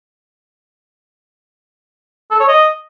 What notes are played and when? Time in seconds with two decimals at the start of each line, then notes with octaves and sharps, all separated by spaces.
2.31 A4
2.40 C#5
2.48 D#5